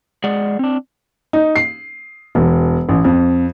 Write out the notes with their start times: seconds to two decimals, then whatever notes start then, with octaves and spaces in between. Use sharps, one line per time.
0.24 G#3 G#4 D5 F#5
0.59 C4 D4
1.33 D#4
1.56 C7
2.35 E1
2.89 A1
3.04 F2